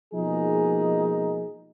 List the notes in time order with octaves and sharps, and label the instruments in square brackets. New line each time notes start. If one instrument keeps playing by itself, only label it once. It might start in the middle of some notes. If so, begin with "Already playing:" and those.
[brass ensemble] B2 F3 G#3 A#3 D#4 G#4